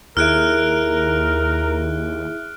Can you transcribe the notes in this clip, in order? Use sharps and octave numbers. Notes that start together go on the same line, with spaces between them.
D#2 E4 G#4 A#4 E5 F6 F#6 D7